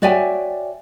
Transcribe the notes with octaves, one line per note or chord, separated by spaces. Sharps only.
F#4 C#5 D5 E5 G5 G#5